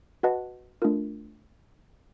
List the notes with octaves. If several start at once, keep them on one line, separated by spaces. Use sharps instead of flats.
F#4 B4 D#5 F#5 A5
A3 D4 F4 A#4